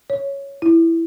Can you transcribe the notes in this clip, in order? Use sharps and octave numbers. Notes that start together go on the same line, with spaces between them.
C#5
E4